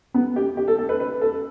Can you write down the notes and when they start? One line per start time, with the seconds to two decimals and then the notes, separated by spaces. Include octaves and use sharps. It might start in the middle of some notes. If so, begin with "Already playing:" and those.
0.14 B3
0.36 G4
0.57 G4
0.68 A4
0.78 A4
0.89 B4
1.00 B4
1.21 A4